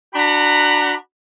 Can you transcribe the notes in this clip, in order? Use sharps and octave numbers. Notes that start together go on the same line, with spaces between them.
D4 F#4 F#5 A#5 B5